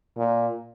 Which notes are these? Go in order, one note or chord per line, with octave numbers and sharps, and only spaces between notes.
A#2